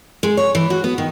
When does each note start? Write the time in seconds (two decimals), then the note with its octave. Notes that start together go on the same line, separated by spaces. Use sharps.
0.23 G#3
0.37 C#5
0.55 E3
0.70 F#4
0.84 B3
0.98 D#3